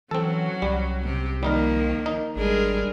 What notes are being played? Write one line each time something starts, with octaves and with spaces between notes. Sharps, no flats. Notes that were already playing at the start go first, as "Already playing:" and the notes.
E3 F#3 C4 C#4 F#4 A4
C2 G3
C3 G4
D#3 F3 G3 A#3 D#4 A#4
D#4
G#1 G3 G#3 D4 G#4 A#4